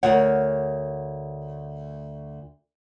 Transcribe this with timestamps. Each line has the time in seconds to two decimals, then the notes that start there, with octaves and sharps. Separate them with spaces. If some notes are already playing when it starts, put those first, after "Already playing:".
0.03 D2 A#4 C#5 F#5